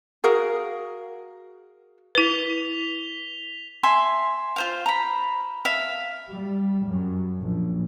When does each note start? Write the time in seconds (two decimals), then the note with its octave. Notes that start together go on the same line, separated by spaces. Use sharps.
0.24 F#4 G#4 A#4 F5
2.15 E4 B4 B6 F7 G7
3.83 E5 G#5 C6
4.56 F4 C5 F5
4.86 A#5 B5
5.65 E5 F5
6.30 G3
6.86 F#2
7.40 A#1